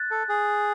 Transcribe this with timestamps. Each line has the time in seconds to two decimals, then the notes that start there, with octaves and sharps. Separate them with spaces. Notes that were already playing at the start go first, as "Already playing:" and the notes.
Already playing: F#6 A6
0.11 A4
0.29 G#4